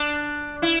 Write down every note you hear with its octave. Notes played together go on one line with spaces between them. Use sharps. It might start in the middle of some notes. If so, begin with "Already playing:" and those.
Already playing: D4
E4